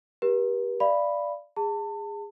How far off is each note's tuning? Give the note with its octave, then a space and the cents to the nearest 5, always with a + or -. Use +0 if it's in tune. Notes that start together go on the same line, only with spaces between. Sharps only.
G4 +0 B4 -45
D5 +0 F5 -30 B5 +0
G#4 -20 A5 +30